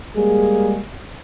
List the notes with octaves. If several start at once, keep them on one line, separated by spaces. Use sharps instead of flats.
G3 G#3 A#3 G#4